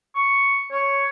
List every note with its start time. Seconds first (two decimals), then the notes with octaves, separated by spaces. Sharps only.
0.15 C#6
0.72 C#5